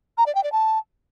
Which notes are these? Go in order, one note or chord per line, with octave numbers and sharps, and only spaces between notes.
A#5
D5
G5
D5
A5